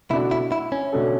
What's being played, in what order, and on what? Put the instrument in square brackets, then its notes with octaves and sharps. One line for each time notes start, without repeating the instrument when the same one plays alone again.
[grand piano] B2 A3 D4 F#4 [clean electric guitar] E4
[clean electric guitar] E4
E4
C#4
[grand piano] B2 A3 D4 F#4 A4